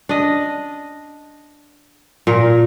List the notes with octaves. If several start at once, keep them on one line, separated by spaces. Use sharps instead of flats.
D4 D#5
A#2 A#4